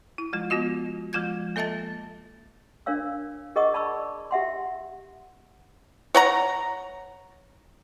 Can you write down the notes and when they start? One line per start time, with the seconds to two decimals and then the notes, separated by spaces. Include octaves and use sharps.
0.18 E4
0.33 F3 G#3 F4
0.50 B3 F4 F#4 D#5
1.13 F3 G#3 F4 G6 G#6
1.56 A#3 A4 D#5 E5 A5 A6
2.86 D4 A#4 C#5 F5 E6
3.56 G#4 A#4 D#5 F#5 C#6 D#6
3.74 D5 A5 B5 C#6 E6
4.31 G4 E5 F#5 C6
6.15 C#5 F#5 A#5